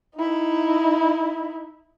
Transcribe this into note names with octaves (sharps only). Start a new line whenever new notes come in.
D#4 E4